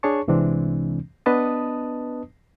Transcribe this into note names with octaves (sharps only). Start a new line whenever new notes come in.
D4 G#4 C#5 A5 C#6
C2 C3 E3 G#3 C4 D4
B3 D4 B4 D#5 A5 D#6